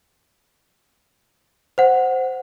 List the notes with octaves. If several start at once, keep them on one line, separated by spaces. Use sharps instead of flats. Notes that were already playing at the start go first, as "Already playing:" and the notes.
C5 F#5